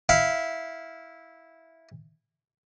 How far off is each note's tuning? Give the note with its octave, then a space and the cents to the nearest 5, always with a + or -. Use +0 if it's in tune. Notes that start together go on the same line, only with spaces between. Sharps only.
E4 -10 F5 +0